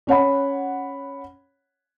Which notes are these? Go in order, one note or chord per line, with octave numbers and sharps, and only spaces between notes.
C#4 C#5 F#5 B5